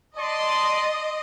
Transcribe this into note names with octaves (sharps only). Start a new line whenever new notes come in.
D5 D#5 A5 C6